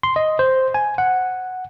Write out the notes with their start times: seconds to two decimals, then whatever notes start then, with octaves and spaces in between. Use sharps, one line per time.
0.03 C6
0.16 D#5
0.39 C5
0.74 G#5
0.98 F#5